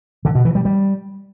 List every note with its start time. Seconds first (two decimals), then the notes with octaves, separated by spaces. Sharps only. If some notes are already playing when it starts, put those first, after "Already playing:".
0.25 D3
0.35 B2
0.45 E3
0.55 G3
0.65 G3